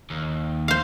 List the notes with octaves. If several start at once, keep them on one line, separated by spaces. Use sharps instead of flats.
D#2
C5 F5